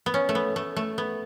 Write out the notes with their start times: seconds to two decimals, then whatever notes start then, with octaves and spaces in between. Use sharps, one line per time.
0.06 B3
0.14 C#4
0.29 A3
0.35 B3
0.56 A3
0.76 A3
0.98 B3